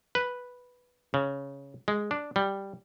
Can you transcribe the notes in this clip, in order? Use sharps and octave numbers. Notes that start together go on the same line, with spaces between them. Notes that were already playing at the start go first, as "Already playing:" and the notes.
B4
C#3
G#3
D4
G3